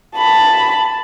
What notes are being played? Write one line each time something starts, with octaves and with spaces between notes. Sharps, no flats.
A5 B5